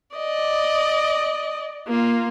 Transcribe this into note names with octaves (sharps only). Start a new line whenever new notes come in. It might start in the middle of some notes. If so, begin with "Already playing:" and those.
D5 D#5
A#3 F4